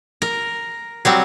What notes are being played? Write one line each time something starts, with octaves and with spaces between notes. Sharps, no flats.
A#4
F#3 G3 C4